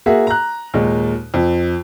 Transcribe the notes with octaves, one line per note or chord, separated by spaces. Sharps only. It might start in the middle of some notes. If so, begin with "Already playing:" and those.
A#3 F#4 G#4 E5
A#5 F#6
D#2 A#2 G#3 D#4
F2